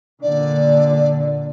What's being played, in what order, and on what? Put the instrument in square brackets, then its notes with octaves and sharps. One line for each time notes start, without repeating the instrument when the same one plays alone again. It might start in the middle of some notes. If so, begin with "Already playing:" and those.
[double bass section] A#2 D3 [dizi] D5